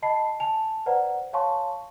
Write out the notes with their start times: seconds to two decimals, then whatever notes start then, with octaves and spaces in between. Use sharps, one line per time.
0.02 D#5 A5 B5 C7
0.40 G#5 A5 F7
0.86 B4 C5 D5 F#5 A#5
1.33 C#5 F5 G#5 A5 C6 C#6